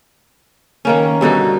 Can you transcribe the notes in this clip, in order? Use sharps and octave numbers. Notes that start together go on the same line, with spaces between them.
D#3 A#3 C#4
G2 B2 D3 D#4